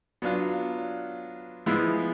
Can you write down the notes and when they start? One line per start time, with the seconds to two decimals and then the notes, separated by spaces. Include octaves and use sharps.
0.22 F#3 B3 D4 F4
1.66 F3 G#3 B3 E4